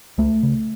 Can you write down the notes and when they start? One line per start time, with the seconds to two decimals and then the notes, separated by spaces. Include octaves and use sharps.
0.18 C#2 A3
0.43 C#3